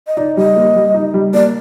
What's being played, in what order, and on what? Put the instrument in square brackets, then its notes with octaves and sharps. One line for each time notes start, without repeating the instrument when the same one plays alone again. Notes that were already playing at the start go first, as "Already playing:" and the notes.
[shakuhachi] D#5
[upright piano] D#4 [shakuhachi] D5
[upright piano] G3 [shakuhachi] D#5
[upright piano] A#3
G3
D#4
G3
[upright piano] A#3 [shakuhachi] D5